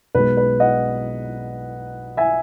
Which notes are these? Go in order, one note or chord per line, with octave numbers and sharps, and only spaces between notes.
B1 B2 G#3 B4
B4
D#5 F#5
E5 G#5